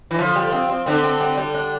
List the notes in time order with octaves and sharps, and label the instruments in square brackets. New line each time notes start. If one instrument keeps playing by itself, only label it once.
[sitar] E3
[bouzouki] D3 [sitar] F3
[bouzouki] G3
C4
C4
[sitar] D3 [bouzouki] C4
[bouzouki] C4
G3
G3
D4